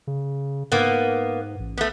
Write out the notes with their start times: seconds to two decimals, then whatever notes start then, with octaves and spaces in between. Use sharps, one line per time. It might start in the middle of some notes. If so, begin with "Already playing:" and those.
0.07 C#3
0.72 G#2 A#3 B3
1.60 A1
1.77 A3 B3